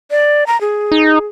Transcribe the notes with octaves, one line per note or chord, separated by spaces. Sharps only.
D5
A#5
G#4
D#4